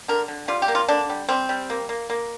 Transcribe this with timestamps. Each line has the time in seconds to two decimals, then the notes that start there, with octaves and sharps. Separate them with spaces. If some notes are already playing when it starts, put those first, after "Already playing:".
0.08 D3 A#4
0.28 D3
0.48 G3 F4
0.62 G4
0.68 A#3
0.75 F4
0.88 D3 D4
1.09 G3
1.29 G3 C4
1.49 G3
1.70 A#3
1.89 A#3
2.10 A#3